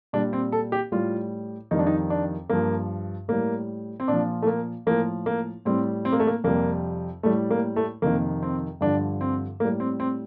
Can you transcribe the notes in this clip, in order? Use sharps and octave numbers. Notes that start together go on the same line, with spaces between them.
A#2 G3 D4
C4
A4
G4
A2 G3 F4
F2 D#3 G3 D#4
D4
D#4
D4
G2 F3 A#3
A2 G3 A#3
C4
A#2 F3 D4
A3
A#3
A2 F3 A#3
A#3
A2 G3 C4
C4
A#3
A3
A#3
F2 C3 G3 A#3
A2 G3 A3
A#3
A3
F2 C3 D#3 A#3
C4
G2 D3 F3 D4
C4
A2 G3 A#3
C4
C4